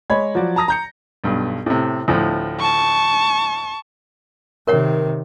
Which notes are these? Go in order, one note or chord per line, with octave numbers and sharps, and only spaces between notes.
G#3 C#5 B5 G#6
F3 F#3 F#4 D5
A5 A#5 D#6 A#6
A#5 G6 C#7
B1 G2
A2 C3
D2 A2 F3
A5 C#6
C3 D#3 A#4 C#5 F#5